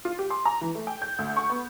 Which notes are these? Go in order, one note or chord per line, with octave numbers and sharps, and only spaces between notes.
F4
G4
C6
A#5
E3
A3
G5
G6
D2
C#6
B3